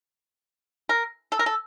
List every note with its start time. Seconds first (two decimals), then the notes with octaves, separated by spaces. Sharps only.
0.89 A#4
1.32 A4
1.39 A#4
1.46 A4